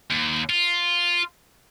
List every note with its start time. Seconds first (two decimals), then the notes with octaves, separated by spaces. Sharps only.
0.11 D#2
0.50 F4